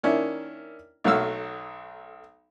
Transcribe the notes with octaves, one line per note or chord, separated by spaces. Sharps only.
D#3 A#3 C#4 D4 E4
B1 F#3 A3 F5 E6